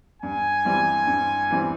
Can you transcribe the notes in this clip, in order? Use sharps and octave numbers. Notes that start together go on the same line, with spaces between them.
G2 G#5
E3 G3 C4
G2
E3 G3 C4